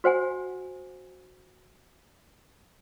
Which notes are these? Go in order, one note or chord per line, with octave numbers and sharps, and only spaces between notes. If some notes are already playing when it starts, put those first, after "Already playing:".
F#4 C5 F#5 G#5